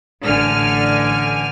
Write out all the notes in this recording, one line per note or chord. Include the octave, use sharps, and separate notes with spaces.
A1 D3 G#5 F6